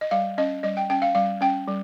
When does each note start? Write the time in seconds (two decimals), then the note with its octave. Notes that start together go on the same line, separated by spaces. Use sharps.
0.01 D#5
0.11 G3 F5
0.38 C#4 D#5
0.63 G3 D#5
0.77 G5
0.90 C#4 G5
1.02 F5
1.15 G3 F5
1.41 C#4 G5
1.68 G3